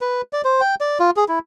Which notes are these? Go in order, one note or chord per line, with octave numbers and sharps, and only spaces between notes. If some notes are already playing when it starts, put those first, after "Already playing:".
B4
D5
C5
G5
D5
F4
G#4
E4